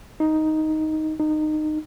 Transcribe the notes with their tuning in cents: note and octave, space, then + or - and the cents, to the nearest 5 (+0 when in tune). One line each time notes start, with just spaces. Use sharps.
D#4 +5
D#4 -20